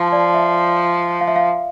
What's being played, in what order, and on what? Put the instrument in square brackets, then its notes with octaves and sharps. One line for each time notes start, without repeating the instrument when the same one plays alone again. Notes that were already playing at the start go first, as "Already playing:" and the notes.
Already playing: [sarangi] F3 [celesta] A5
[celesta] D5
E5
F5
E5
F5